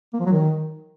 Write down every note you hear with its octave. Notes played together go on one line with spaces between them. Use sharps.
A#3
F3
F#3
D#3